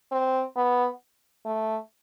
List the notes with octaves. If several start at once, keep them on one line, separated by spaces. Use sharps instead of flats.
C4
B3
A3